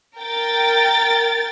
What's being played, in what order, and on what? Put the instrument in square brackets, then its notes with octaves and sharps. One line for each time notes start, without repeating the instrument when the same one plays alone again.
[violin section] A#4 G5 A6